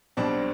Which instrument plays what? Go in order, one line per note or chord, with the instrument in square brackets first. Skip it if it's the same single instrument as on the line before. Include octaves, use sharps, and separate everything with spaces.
[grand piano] B1 B2 G3 C4 D4